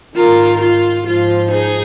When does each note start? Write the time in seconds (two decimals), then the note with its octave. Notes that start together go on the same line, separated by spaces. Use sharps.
0.15 G#2 D#3 F4 A#4
0.60 F4
1.05 G#2 F3 F4
1.50 D#4 G#4